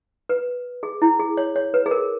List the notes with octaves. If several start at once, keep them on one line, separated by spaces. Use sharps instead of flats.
B4
G#4
E4
G#4
C#5
C#5
B4
G#4
A#4